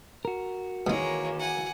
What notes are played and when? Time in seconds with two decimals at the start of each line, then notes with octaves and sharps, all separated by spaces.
0.25 F#4 A#4
0.87 B2 D#3 E3 G#3 A#3 D#4 C#5
1.39 F#5 G#5